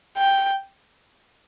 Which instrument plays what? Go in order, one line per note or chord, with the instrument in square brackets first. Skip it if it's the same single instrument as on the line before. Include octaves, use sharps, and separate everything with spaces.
[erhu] G5